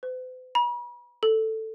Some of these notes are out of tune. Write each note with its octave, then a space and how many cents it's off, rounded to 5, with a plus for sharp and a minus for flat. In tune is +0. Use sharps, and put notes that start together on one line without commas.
C5 -45
B5 -40
A4 +5